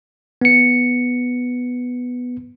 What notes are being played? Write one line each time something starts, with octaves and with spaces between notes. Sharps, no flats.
B3 C#7